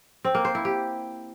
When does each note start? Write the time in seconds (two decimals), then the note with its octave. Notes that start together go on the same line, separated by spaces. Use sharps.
0.25 C4
0.35 A#3
0.45 C5
0.55 E4
0.65 G4